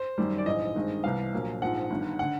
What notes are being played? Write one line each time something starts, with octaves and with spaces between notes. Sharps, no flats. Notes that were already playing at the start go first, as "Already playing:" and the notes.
Already playing: C5
F#2 D#3 G3
D5
A#1 G#2 E3 D#5
G2 D#3 G#3 C4
C2 C3 E3 G3 B3 F5
A#1 A#2 F#3 A#3
A#1 G#2 F3 F#5
G1 G2 D#3
D3 F#5